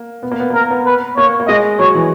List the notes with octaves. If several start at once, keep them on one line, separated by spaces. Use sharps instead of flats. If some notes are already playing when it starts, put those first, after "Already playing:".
Already playing: A#3
B3
A#3
B3
A#3
B3 A#4
B3
B4
A#3 C#5
A#3
G#3 D#5
F#3 C#5
E3